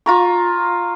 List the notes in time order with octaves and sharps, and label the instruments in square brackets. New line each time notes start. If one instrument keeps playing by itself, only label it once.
[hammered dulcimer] F4 A#5 C#6